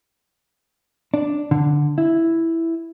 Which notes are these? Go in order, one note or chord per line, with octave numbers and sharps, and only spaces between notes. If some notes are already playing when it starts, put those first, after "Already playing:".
D4
D3
E4